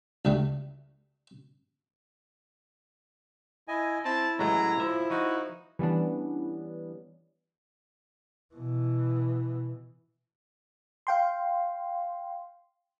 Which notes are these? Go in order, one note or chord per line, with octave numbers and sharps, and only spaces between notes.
C#2 D3 G3 A3
E4 D#5 G#5
C4 E4 A5
A1 F#3 G#3 A3 A#5
F3 E5
F3 D#4 F#4
E3 G3 B3 C#4 D4
B2 E3
F5 G5 C6